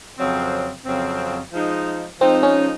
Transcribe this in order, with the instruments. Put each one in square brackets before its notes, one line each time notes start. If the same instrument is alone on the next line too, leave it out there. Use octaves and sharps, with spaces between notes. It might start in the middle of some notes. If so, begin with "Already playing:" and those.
[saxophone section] F2 C#3 F#3 C4
F2 C#3 F#3 C4
F3 G#3 D#4
[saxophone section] F3 G#3 D#4 [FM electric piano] C4
[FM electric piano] C#4